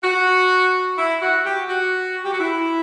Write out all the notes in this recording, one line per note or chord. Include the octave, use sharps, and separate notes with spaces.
F#4
E4
F#4
G4
F#4
G4
F#4
E4